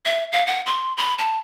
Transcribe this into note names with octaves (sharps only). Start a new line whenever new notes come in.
E5
F5
F#5
C6
B5
A5